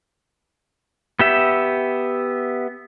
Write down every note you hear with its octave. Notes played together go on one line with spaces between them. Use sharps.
B3 G4 E5